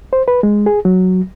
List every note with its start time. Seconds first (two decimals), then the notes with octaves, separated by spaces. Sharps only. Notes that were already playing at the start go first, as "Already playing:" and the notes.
0.13 C5
0.28 B4
0.43 G#3
0.66 G#4
0.85 F#3